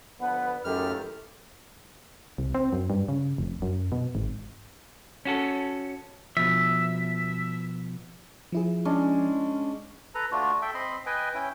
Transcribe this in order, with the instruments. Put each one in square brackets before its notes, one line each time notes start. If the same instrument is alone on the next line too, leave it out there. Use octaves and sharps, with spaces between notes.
[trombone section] D3 F3 B4 [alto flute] B3 [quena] F#5
[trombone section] C#2 A2 D#3 [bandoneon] F#2 F6 [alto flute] G4 [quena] A4
[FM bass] C2
C4
F#2
G2
C#3
F1
F#2
B2
G#1
[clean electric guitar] C#4 F#4 A4
[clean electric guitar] B2 F3 [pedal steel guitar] E5
[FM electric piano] F3 E4 G#4
[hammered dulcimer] G#3 C#4 D4
[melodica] A4 B4 A#5
A3 D4 F4 F#4
A4 E5 G5
C4 D#5 B5 C6
B4 D#5 G5 G#5
C#4 E4 G5